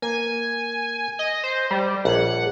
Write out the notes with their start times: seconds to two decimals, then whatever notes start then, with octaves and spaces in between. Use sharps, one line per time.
0.02 A#3 G#5
1.19 D#5
1.44 C5
1.71 G3 C5
2.05 A#1 C#5 F#5